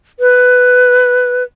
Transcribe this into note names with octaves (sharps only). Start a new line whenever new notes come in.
B4